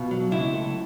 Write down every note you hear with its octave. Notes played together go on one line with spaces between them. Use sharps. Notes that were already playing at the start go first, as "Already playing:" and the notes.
Already playing: B2 F4
F#3
C#2 E4
A3